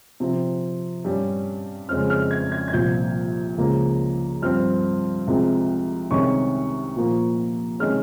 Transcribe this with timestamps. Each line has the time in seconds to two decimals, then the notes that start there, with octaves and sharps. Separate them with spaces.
0.20 C3 F3 C4
1.04 G2 G3 C#4
1.89 F2 C#3 G#3 C#4 F6
2.10 F6
2.31 G#6
2.52 G#6
2.68 G#6
2.73 C2 A#2 F3 G6
3.58 C#2 C#3 F3 A#3
4.42 G2 F3 C4 F6
5.27 C2 C3 F3 G#3
6.11 C2 C3 D#3 G#3 C#4 C#6
6.96 A#2 F3 A#3
7.79 C3 D#3 G#3 C#4 F6